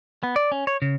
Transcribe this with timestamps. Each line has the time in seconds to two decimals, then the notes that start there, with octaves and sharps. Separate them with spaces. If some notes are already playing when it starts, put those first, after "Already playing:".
0.23 B3
0.36 D5
0.52 C#4
0.67 C#5
0.82 C#3